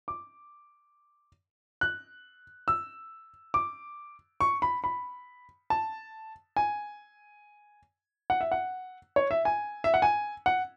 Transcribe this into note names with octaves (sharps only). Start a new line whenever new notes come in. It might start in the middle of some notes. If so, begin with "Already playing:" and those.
D6
F#6
E6
D6
C#6
B5
B5
A5
G#5
F#5
E5
F#5
C#5
E5
G#5
E5
F#5
G#5
F#5